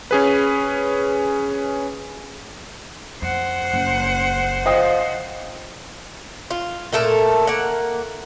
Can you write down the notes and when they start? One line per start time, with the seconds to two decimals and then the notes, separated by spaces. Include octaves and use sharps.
0.11 C#4 G#4 B4
3.22 F2 C5 F#5
3.73 F#1
4.66 F3 D#5 G5 D#6
6.51 F4
6.92 A#2 A3 A4 A#4
7.47 A#3 F#5